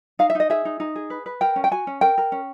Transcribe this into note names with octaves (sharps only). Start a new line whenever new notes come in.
D#4 F5
E5
D#4 D#5
G#4 E5
D#4
D#4
G#4
B4
B4
A#4 G5
C#4
G5
F#4 G#5
C#4
A#4 G5
A#4
C#4